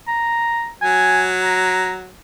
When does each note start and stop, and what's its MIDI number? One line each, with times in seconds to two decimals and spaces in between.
0.08 0.69 82
0.81 2.13 54
0.81 1.26 80
1.44 1.95 82